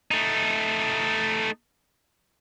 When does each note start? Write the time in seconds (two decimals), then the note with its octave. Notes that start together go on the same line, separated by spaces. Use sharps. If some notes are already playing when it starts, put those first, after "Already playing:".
0.11 A3 D#4